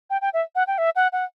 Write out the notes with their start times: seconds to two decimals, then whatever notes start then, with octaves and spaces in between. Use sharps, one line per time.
0.10 G5
0.21 G5
0.33 E5
0.55 F#5
0.67 G5
0.78 E5
0.96 F#5
1.12 F#5